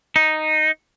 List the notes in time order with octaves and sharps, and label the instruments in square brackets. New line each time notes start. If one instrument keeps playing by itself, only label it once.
[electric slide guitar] D#4